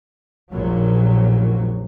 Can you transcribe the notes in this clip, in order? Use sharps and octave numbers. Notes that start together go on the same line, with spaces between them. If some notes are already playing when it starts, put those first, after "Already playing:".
F1 A#1 A#2 F#3